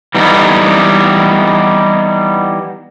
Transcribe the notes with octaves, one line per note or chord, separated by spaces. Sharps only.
E3 G3 B3 D#4